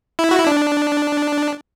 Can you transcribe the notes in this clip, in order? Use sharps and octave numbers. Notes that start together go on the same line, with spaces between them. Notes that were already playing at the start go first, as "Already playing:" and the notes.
E4
F#4
E4
D4